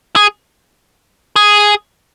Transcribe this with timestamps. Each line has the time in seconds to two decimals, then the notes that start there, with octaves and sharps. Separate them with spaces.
0.16 G#4
1.36 G#4